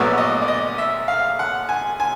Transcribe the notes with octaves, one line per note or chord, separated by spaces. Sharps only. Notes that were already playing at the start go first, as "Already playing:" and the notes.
Already playing: A#1 A2 F#3 B3 D5
D#5
D5
D#5
E5
F5
F#5
G#5
G#5